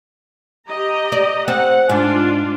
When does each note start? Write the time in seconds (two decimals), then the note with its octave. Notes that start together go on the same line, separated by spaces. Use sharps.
0.67 G4 D#5 A#5
1.12 D5
1.48 C4 F#5
1.89 G#2 D4 F4